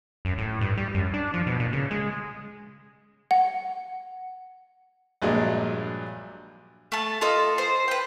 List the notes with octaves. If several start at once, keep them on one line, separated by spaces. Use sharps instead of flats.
F#2
A2
G2
G3
F#2
D4
F3
B2
A#2
C#3
G#3
F#5
A#1 G2 F#3 G#3 D4
A3 A5
F4 A4 D#5
C5
B4 G5